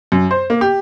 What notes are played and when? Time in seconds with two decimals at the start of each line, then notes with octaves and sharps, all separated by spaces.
0.12 F#2
0.31 C5
0.50 A#3
0.61 G4